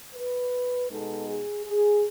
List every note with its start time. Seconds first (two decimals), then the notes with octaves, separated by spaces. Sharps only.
0.15 B4
0.90 B2 G#3 B3 D#4 A4
1.28 G#4
1.65 G#4